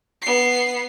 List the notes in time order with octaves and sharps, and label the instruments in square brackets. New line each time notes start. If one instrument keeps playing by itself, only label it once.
[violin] B3 C7